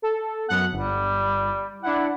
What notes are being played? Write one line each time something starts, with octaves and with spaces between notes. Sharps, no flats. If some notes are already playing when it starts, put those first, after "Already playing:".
A4
F#2 B3 F#5
G1 G3
D4 E4 F#5